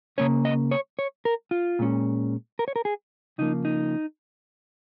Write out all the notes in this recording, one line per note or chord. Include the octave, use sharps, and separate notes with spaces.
C#3 A#3 C#4 C#5
D#5
C#5
C#5
A#4
F4
A#2 G#3 C#4
A#4
C#5
A#4
G#4
C#3 F3 A#3 D#4
D#4